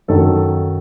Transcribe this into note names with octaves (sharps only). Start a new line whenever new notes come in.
F#2 D#3 F#3 A4